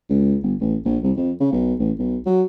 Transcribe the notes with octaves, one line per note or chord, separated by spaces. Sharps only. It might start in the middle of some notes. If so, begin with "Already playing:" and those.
C#2
G1
A1
A#1
C2
F2
C#3
B1
A1
B1
F#3